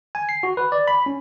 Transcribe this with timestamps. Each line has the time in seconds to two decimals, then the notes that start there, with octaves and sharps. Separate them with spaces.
0.15 G#5
0.29 C7
0.43 F#4
0.57 B4
0.72 D5
0.88 B5
1.06 C#4